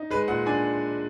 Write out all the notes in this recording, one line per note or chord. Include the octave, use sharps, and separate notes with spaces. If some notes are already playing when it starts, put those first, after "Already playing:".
Already playing: D#4
G#3 B4
A#2 F#5
D4 G#5